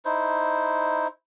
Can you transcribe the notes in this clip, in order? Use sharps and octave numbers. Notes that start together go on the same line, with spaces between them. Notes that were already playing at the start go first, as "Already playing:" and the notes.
D#4 E4 C5